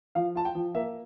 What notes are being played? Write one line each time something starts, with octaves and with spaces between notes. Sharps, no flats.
F3 F5
F4 A5
G5
F3
A#3 E5